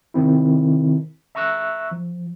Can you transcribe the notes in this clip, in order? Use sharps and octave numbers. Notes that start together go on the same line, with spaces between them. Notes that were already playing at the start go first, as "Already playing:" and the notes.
C3 D#3 C4 E4
E5 A#5 C#6 E6 F#6
F3